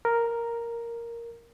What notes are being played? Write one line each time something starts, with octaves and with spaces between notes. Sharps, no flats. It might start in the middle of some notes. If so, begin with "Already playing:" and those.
A#4